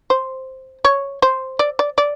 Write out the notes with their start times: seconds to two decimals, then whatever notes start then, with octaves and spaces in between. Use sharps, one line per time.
0.10 C5
0.85 C#5
1.22 C5
1.59 D5
1.79 D5
1.98 D5